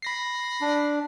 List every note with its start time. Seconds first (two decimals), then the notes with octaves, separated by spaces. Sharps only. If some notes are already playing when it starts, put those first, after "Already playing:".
0.02 B5 A#6 C7
0.61 D4